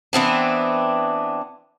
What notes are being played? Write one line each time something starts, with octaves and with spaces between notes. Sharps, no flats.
E3 B3 C4 D4